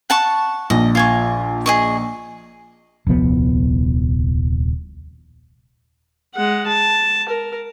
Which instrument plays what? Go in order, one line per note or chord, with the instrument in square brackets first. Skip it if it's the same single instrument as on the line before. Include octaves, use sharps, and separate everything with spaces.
[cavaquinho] F#5 A5 C#6
[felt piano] A#1 [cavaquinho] D#5
[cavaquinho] F4 G#5 C#6
G#4 D#5 C#6
[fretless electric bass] D#1 C2 F3 B3
[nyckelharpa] G#3 F#5
A5
A#4